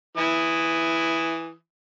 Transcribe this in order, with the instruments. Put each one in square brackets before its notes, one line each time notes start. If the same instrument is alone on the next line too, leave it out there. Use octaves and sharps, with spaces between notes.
[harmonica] E3 E4 D#6